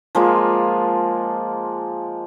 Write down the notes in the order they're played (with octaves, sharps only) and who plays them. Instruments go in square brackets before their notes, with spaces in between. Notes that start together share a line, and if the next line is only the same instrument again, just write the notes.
[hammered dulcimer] F3 G#3 A#3 F4